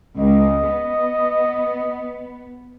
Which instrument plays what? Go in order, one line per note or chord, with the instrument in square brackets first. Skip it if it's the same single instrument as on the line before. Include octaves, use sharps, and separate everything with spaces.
[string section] C#2 [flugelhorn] D#5
[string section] B3